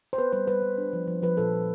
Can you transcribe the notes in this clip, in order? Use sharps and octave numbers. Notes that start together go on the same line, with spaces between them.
C5
B3 B4
G3 C5
G3 B4
G3
D4
F3
F3
F3 B4
A#2 A4
A#2